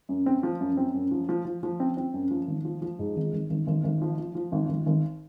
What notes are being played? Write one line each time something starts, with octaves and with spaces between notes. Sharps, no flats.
F#2
C4
F3
F#2
C4
F#2
F3
F3
F3
F3
C4
C4
F#2
F3
G#1
F3
F3
G#2
G#1
G#1
G#1
G#1
G#1
F3
F3
F3
G#1
G#1
G#1